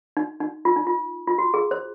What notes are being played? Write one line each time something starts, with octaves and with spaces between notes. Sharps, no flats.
D#4
D#4
F4
D#4
F4
F4
F#4
G#4
C5